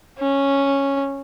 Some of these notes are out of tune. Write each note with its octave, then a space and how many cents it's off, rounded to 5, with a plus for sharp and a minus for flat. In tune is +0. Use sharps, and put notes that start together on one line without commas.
C#4 -5